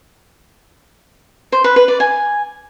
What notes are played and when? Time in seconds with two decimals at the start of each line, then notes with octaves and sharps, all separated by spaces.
1.52 C5
1.64 B4
1.76 B4
1.88 D5
2.00 G#5